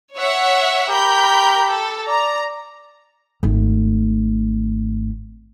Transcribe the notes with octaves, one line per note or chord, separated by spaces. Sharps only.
C#5 E5 F#5
G4 A#4 B5 G6
A4
D5 A#5
G#1 A3